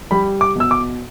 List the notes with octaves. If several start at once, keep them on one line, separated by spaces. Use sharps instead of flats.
G3 B5
D6
B2 E6
D6